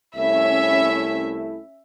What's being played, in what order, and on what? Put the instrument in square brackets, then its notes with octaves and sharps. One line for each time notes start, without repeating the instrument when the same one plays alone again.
[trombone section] C2 A3 E4 [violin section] C#4 E5